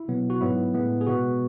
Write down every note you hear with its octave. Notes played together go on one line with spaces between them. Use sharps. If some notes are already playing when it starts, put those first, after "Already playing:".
Already playing: E4
B2 F#3 B3
F#4
G#2 F#3 B3 E4
A2 G#3 B3
G#4
B2 G#3 B3 F#4